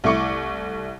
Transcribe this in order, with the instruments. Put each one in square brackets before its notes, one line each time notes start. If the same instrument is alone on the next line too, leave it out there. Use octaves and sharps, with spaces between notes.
[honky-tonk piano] C2 A3 E4 C#6 D6 C#7